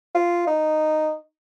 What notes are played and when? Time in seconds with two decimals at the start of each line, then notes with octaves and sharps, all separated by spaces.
0.15 F4
0.47 D#4